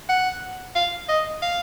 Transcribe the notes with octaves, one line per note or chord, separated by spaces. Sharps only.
F#5
F5
D#5
F5